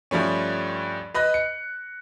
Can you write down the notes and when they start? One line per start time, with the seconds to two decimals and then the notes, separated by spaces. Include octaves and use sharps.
0.11 G2 F3 G3 A3 C#4
1.14 B4 D#5 B5 F#6
1.34 C#7